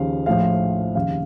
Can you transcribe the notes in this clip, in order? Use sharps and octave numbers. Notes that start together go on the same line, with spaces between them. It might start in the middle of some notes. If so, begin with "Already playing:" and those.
Already playing: D#2 C#3 F3 F5
A#1 A2 F3 F5
F1 D#2 C#3 F5